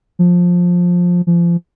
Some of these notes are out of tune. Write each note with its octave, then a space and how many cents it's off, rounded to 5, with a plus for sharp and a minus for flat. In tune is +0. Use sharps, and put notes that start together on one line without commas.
F3 +15
F3 -30